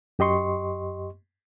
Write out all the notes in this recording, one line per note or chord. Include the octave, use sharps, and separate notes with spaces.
F#2 G4 D#5 C6 C#6